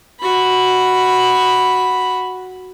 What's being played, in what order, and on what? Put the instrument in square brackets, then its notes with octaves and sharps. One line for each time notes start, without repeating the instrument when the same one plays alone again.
[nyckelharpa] F#4 B5